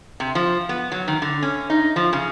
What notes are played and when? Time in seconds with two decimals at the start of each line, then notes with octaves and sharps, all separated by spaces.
0.20 C3
0.35 F3
0.69 B3
0.92 F#3
1.08 D#3
1.22 D3
1.43 C#4
1.70 D#4
1.96 F3
2.13 C#3